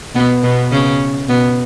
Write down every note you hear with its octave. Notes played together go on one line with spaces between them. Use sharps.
B2 B3
B2 B3
C#3 C#4
B2 B3